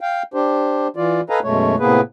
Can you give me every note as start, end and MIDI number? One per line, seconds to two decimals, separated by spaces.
0.01 0.23 77
0.01 0.23 79
0.34 0.88 62
0.34 0.88 67
0.34 0.88 72
0.96 1.21 52
0.96 1.21 65
0.96 1.21 74
1.30 1.40 69
1.30 1.40 71
1.30 1.40 75
1.30 1.40 77
1.30 1.40 80
1.30 1.40 82
1.44 1.75 42
1.44 1.75 47
1.44 1.75 56
1.44 1.75 57
1.44 1.75 73
1.79 2.01 45
1.79 2.01 48
1.79 2.01 58
1.79 2.01 59
1.79 2.01 68
1.79 2.01 71